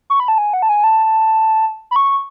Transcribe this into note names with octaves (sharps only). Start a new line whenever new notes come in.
C#6
B5
A5
G#5
F#5
A5
G#5
A5
B5
C#6